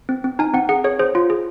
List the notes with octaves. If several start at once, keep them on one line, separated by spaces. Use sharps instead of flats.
C4
C4
D#4 G#5
C4 F#5
G#4 F#5
G#4 C#5
G#4 C5
F4
G#4